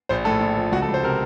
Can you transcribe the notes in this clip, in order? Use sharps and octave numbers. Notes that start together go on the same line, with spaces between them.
A#1 C5
A2 A4
A#1
F3
C#2 F#4
A4
C#2
C5
C3 A#4